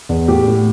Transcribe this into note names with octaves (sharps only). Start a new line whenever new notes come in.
E2
A2 G4
A2